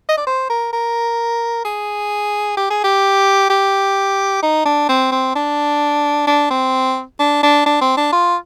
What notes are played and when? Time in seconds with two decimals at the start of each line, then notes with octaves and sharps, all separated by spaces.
0.08 D#5
0.17 D5
0.26 C5
0.50 A#4
0.73 A#4
1.65 G#4
2.57 G4
2.70 G#4
2.84 G4
3.50 G4
4.42 D#4
4.65 D4
4.89 C4
5.12 C4
5.35 D4
6.27 D4
6.50 C4
7.19 D4
7.43 D4
7.66 D4
7.81 C4
7.97 D4
8.12 F4